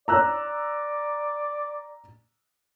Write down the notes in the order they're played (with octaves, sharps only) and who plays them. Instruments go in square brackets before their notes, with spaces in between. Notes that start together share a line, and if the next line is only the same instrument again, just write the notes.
[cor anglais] D5 [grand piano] A#5 E6 F#6